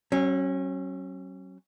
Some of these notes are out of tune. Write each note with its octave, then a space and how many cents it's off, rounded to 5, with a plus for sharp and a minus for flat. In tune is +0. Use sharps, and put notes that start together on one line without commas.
F#3 +30 C#4 -25